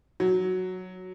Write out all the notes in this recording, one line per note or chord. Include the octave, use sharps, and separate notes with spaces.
F#3